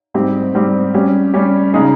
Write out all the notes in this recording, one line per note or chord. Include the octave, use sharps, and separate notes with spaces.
G#2 G3 C4 G4
G#2 G3 C4 G4
G3 C#4 G4
G3 C#4 G4
C#3 G#3 D#4 G#4